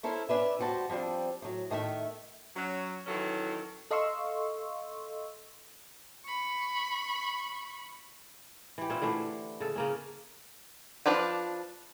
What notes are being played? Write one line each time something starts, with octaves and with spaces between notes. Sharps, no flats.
C#4 E4 A4 A#4 C5
C#4 D4 B4 E5
D2 G3 F#4 C5 A5
F3 G3 C4 D4
A2 F#3
A2 D#3 A3 B4 E5
F#3 C#4
D#3 E3 F#3 C#4 E4 A4
A4 D#5 F5 C6 C#6 E6
B5 C#6
E3 G4
A#2 C#4 E4 C5
D3 E3 A3 D4
C#3 A4
C#3 A#3 C#4
F3 D4 F4 B4 G5